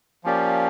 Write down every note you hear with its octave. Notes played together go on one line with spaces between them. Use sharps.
F3 A#3 C#4 G4 D5